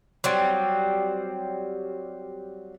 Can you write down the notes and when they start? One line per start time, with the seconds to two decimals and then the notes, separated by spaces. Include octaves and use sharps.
0.24 F#3 G3 C4